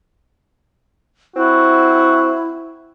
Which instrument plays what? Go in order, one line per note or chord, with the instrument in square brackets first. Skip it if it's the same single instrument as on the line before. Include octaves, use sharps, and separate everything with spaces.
[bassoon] C4 [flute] E4 [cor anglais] F#4